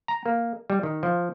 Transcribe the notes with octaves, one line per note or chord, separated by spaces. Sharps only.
A#5
A#3
G3
D#3
F3